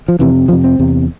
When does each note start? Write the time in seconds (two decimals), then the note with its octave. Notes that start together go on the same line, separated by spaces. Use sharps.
0.08 F3
0.19 F2 C3 E3
0.48 F2 C3 F3
0.64 C4
0.79 E2 C3